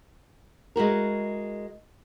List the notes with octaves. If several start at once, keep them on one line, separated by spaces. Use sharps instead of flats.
G#3 E4 F#4 A#4